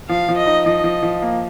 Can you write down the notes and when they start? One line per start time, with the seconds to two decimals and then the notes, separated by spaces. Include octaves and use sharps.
0.09 F3 F5
0.29 F3
0.37 D#5
0.46 D#4
0.66 F3 D#5
0.84 F3
1.03 F3
1.22 A#3